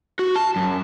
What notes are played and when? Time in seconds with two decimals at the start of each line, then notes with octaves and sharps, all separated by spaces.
0.19 F#4
0.36 A5
0.56 F#2